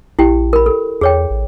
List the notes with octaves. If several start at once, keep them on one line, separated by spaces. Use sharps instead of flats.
A#1 E4 G4 G5
A#4 B5
A4
E2 G#4 C#5 G5
A1